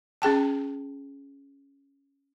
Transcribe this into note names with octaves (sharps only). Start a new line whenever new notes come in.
C#4 G#4 G5 A5